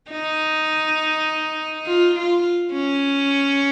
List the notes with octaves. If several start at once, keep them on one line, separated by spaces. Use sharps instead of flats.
D#4
F4
F4
C#4